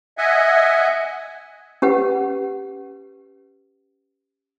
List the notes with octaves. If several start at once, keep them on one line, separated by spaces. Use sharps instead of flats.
D#5 E5 F#5 G#5
C#4 G4 B4 F#5